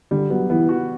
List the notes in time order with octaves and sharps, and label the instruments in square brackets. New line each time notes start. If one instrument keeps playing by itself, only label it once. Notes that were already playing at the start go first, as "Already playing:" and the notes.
[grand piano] D3 [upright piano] G3
[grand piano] F#3 [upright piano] B3
[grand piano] E3 [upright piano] B3
[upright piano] F#4